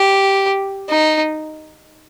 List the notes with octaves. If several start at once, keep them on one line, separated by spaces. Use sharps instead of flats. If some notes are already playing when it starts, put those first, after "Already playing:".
Already playing: G4
D#4